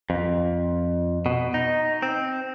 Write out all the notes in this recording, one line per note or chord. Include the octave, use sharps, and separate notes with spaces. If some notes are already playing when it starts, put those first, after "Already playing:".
F2
B2
D#4
C4